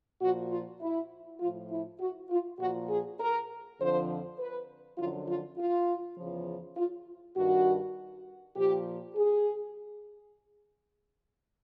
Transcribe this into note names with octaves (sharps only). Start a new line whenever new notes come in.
A#2 F3 F#4
F4
E4
A2 F3 F4
E4
F#4
F4
A#2 F3 F#4
G#4
A#4
F2 D3 F3 C5
B4
F#2 D3 F3 F4
F4
F4
E2 C#3 F3
F4
G2 D#3 F#4
A#2 F3 G4
G#4